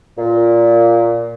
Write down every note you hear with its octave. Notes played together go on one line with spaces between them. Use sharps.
A#2